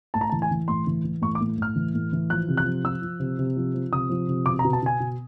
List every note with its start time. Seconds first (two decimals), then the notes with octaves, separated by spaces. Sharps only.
0.14 A2 A5
0.21 A#5
0.30 A5
0.32 E3
0.42 G#5
0.51 E3
0.68 A2 C6
0.87 E3
1.05 E3
1.22 A2 C#6
1.35 D6
1.41 A2
1.58 A2 F6
1.76 E3
1.95 A2
2.13 E3
2.30 F3 F#6
2.48 C3
2.57 F#6
2.66 F3
2.84 F3 E6
3.02 F3
3.20 C3
3.39 C3
3.57 F3
3.75 F3
3.92 C3 D#6
4.10 F3
4.28 C3
4.46 B2 D6
4.59 A#5
4.65 B2
4.73 A5
4.82 B2 G#5
5.00 B2